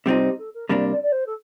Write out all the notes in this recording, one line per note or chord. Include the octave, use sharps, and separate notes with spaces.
C3 G3 C4 D#4 F4
G4
A4
A#4
C3 G3 A#3 D4 D5
D5
D5
C5
A4